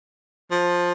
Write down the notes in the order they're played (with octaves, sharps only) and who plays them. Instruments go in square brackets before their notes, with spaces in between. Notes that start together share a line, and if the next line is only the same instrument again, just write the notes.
[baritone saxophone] F3